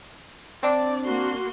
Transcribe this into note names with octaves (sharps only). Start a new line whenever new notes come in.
C4 D4 D5
A#3 F#4 C6